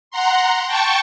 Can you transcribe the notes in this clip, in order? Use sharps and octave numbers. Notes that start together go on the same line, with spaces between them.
F#5 A#5 C6
G5 A5 C#6